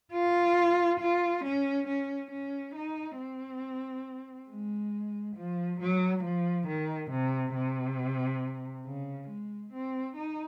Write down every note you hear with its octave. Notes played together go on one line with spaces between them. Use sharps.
F4
F4
C#4
C#4
C#4
D#4
C4
G#3
F3
F#3
F3
D#3
C3
C3
C#3
G#3
C4
D#4